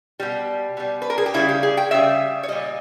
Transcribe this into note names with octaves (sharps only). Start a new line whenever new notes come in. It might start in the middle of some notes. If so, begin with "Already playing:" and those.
B2 G3 G4
B2 G3
B4
A#4
G#4
G4
C#3 G3 E4
G4
G#4
G5
C#3 G3 E5
C#5
A#2 G3 D#5